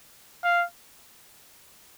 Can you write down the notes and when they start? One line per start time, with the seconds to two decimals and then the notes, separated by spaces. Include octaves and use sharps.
0.44 F5